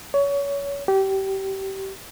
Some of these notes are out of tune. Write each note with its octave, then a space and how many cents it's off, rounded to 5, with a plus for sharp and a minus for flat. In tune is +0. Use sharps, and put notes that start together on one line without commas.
C#5 +25
G4 -25